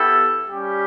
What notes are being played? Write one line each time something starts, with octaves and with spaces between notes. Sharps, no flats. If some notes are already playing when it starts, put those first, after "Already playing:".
Already playing: B3 E4 G4 A4
G3 C#4 G4